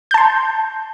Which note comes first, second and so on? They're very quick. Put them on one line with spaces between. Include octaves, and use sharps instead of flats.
G6 A5 C6